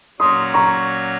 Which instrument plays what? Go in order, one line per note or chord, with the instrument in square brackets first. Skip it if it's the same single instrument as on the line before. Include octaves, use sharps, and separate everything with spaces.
[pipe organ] A#2 F#3 C#4 [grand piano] C6 D#6
[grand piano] A#5 C#6